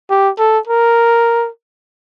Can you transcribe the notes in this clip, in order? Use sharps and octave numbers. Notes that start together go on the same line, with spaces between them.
G4
A4
A#4